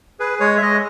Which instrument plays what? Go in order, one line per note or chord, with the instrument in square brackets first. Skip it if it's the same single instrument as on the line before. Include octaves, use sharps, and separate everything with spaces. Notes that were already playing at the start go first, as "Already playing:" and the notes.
[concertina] G#4 B4
G#3 C#5
E5
G#3 D#5